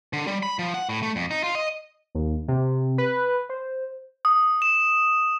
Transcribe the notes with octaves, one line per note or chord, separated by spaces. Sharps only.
D3
G3
B5
F3
F#5
A2
A3
F2
D#4
F4
D#5
D#2
C3
B4
C5
D#6
E7